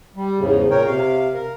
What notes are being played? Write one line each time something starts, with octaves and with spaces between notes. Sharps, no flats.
G3
E2 G#2 C#3
A#2 C#3 A#4 C#5 G5
C3 F5
A#4